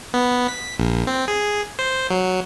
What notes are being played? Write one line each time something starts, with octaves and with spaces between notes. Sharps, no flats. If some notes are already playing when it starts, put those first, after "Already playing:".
B3
B6
A#1
C4
G#4
C5
F#3